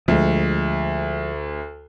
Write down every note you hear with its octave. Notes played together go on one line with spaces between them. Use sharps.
D2 F3 G#3